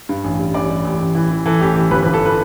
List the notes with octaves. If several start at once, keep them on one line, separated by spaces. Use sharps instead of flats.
G2
A1
G3
A1 D5
G3
A1
A1
E3
E3
E3 A4
A1 G4
E3
G1 B4
B4
G1
A4
B4